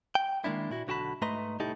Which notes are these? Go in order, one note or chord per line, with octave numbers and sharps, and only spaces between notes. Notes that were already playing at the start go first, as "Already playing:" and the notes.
G5
D#3 G#3 A#3 D4 E4
A#2 E4 F#4
B1 D3 F#4 G5 A5 B5
G#2 A3 B4 D#5 A#5 C6
C2 A2 D#4 E4 G4 A4